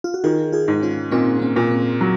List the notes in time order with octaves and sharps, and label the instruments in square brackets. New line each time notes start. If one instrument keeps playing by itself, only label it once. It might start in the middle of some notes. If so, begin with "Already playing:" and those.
[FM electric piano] F4
F#4
[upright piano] D#3 [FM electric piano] F4 G#4
[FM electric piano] F4 G#4
[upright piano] G#2
[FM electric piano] C#4 F4
[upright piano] A#2 [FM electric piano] C4 D#4
[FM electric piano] C4
A#3 C#4
[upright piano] A#2
[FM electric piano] C4
[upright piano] F#3